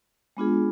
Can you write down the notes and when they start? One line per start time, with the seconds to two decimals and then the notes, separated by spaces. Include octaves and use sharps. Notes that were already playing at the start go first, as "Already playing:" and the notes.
0.37 G#3 B3 D4 F4 G#4